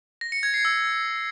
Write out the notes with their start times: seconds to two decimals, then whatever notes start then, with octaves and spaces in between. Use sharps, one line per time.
0.21 A#6
0.32 C#7
0.43 G#6
0.54 C7
0.65 E6